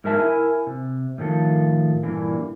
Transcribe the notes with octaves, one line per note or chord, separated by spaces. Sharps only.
G#2 G#3 A#4 D#5 E5 A5
E4 A#4 G#5
C3
A2 D#3 F3 A4
G2 A#2 D3 E3